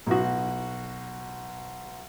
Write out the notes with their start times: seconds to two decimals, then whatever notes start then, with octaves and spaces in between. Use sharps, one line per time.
0.06 B1 F#4